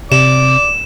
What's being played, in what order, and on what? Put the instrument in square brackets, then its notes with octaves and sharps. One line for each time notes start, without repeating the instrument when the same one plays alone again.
[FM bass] C3 [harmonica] D5 D6 [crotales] E7